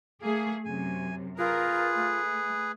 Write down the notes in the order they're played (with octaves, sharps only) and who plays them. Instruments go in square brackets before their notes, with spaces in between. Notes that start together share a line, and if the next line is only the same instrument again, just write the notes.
[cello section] A3 G#4 [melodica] A#3
[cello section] F#2 C3 [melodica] G#5
[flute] F4 [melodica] G#4 B4 [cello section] A#4
[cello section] A3